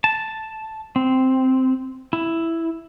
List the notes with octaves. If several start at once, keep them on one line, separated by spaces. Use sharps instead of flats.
A5
C4
E4